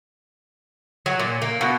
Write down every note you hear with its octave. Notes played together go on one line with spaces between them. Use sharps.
F#3
A#2
A#3
B2